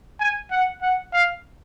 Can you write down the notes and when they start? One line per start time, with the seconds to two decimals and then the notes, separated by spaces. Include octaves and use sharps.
0.20 G#5
0.51 F#5
0.82 F#5
1.13 F5